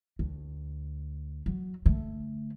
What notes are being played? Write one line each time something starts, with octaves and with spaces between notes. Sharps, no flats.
D2
F#3
D3 A3